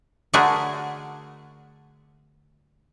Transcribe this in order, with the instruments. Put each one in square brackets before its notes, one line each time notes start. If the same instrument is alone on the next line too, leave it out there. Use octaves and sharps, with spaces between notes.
[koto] D3 A3 F#4 G#4 A#4